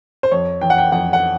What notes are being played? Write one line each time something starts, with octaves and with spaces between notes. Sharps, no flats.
C5
F2 C#5
E3 G5
F#5
G5
F2 F#5
F#5